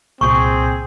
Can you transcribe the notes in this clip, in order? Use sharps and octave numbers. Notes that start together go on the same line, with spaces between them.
C2 A#2 C4 G#4 C#6 G6